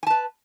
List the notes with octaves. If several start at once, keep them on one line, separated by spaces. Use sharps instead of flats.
B4 G#5 A5